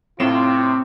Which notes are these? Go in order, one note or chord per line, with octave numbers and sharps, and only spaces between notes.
A2 C3 C4 F4 C#5 C6 E7